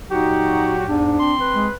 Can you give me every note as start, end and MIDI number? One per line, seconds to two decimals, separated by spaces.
0.11 0.83 46
0.11 0.83 54
0.11 0.73 63
0.11 0.83 66
0.11 0.99 67
0.87 1.16 40
0.87 1.16 44
0.87 1.34 62
1.19 1.69 60
1.19 1.69 84
1.40 1.74 71
1.54 1.68 56